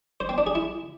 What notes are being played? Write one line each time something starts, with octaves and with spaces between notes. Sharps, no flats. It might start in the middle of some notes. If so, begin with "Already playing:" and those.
C5
C4
D4
G#4
E4